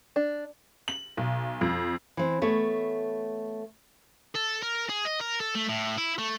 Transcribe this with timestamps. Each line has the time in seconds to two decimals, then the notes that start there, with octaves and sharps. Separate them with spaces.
0.16 D4
0.88 F#7
1.17 B1
1.61 F2
2.17 E3 C4
2.42 A3 B3 C#5
4.35 A4
4.63 A#4
4.90 G#4
5.06 D#5
5.20 A#4
5.41 A4
5.55 A3
5.69 A2
5.98 E4
6.18 A3